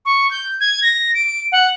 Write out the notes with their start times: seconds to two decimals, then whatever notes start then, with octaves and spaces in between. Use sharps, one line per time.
0.05 C#6
0.31 G6
0.60 G#6
0.83 A#6
1.15 D7
1.52 F#5